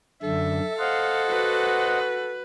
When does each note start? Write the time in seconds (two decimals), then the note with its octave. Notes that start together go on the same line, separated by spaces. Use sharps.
0.23 F#2 D3 A4 E5
0.79 C5 D#5 F5 F#5
1.29 F#4 B4